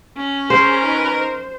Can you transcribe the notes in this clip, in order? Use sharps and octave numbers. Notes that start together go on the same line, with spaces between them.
C#4
G#4 A#4 C5
D#4 B4
C5